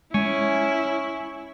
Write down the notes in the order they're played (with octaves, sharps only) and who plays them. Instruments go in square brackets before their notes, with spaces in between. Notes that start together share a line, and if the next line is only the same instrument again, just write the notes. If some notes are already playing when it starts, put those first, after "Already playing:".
[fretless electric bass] G#3 [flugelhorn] C#4 [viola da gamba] E4 [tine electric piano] G#5 C#6